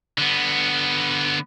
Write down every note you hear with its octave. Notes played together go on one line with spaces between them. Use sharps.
D3 B3